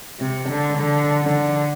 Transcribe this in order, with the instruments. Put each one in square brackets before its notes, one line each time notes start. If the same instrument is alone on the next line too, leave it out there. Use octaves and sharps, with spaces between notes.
[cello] C3
D3
D3
D3